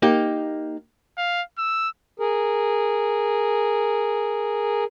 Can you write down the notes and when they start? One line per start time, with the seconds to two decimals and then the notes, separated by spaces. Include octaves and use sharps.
0.02 A#3 D#4 G4
1.18 F5
1.58 E6
2.20 G#4 A#4